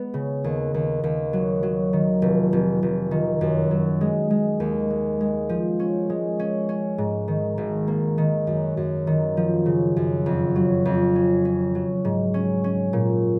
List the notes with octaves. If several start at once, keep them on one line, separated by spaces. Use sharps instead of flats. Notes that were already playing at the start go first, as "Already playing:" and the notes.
Already playing: G#3 B3
C#3
D#2
D#2
D#2
F#3
F#3
D#3
F1
F1
F1
D#3
F#2
F#3
G#3
G#3
D#2
G#3
G#3
F3
C#4
G#3
C#4
C#4
G#2
D#3
G#1
A#3
D#3
F#2
F#2
D#3
F3
C#3
F#2
F2
F#3
F2
C#4
C#4
F#3
G#2
C#4
C#4
A#2